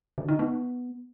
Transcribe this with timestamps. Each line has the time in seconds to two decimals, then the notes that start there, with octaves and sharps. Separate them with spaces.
0.18 D3
0.28 D#4
0.39 B3